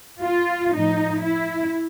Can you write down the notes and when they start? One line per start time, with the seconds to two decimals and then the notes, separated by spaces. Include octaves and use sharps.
0.22 F4
0.73 A2 F3 D#4
1.22 E4